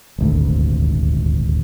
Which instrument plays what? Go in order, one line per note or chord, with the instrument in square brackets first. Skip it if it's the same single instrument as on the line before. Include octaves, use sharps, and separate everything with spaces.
[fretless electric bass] D#1 G#1 D2